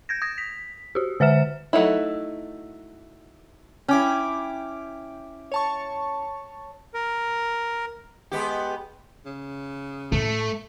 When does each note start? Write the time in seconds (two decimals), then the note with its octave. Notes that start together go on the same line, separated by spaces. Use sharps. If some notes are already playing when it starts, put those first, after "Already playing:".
0.09 G6 G#6 A#6
0.22 D#6 G#6 A#6
0.38 B6
0.95 F#4 G4
1.20 D3 C5 E5 F6 E7
1.73 F#3 A3 D#4 E4
3.88 C#4 E4 G5 D6
5.52 C#5 A5 C#6
6.94 A#4
8.31 G#3 B3 G4
9.26 C#3
10.12 A2 A3